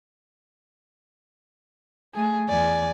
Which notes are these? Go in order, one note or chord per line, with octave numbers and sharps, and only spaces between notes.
A3 G#4
E2 D5 G#5